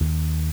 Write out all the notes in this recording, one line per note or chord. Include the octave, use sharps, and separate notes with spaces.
D#2